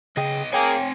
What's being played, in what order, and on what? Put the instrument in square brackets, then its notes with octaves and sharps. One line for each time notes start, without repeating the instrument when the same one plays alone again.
[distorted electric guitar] B1 D#5 [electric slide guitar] C#3 G#4 G5
[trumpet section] A#3 G#4 [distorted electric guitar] C4 G#5 [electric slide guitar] C#5 G5